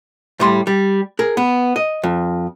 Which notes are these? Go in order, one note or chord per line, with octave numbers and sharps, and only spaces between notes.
A2 G3 C6
G3
G#4 A#4
B3
D#5
F2